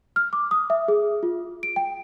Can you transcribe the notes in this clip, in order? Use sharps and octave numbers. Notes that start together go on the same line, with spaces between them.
F6
D6
D#6
E5
G#4
F4
D7
G5